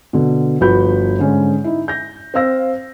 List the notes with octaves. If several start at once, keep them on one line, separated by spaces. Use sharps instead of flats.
B2 D3
G1 F3 F#4 B4 B5 G6
G#2 D3 C#4
D#4 E4
G6 A#6
C4 C5 F5 E6 A#6